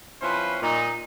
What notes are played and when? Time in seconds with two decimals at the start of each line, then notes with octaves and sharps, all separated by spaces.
0.22 F3 C4 C#4 E4 B4 C5
0.62 A#2 D#4